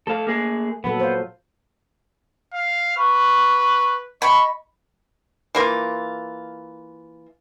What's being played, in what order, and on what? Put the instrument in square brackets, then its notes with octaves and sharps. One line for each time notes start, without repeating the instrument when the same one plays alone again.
[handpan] A3 [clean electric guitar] A4 F5
[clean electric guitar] A#3 G#4
[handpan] A#2 F#3 A4 [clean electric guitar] B3
[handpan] C5 F5
[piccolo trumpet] F5
[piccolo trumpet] B4 [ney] C#6
[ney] D#5 [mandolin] B5 [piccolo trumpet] C#6
[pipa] E3 A#3 F4